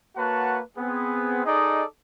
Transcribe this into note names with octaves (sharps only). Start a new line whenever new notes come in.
A#3 F#4 B4 C#5 F#5 A5
B3 C4 G#4
D#4 G#4 A4 D5 D#5 D#6